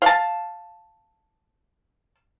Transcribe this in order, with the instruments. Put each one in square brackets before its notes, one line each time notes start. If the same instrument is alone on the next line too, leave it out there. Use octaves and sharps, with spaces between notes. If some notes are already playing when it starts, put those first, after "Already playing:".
[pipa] F5 A5